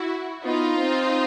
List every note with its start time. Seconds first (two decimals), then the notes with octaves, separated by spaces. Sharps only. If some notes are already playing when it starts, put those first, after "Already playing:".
Already playing: E4 F#4
0.45 B3 D#4 F4
0.78 C4